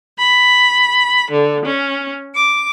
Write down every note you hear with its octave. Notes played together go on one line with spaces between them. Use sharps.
B5
D3
C#4
D6